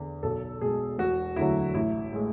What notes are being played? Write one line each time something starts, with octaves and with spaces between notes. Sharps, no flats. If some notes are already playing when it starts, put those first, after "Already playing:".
Already playing: E2 D3
B1 A4
B2 G#3 G#4
E1 F#4
D2 D3 F#3 E4
A1 E4
A2 G#3